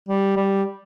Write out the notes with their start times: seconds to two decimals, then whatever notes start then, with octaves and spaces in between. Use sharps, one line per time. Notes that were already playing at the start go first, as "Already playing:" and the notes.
0.09 G3
0.37 G3